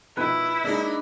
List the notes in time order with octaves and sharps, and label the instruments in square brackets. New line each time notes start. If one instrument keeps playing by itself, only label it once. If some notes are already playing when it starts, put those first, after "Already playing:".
[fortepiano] B2 D#3 F3 [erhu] E4 [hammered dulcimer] B4
[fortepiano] G#3 A#3 G#4 [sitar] D4 D#4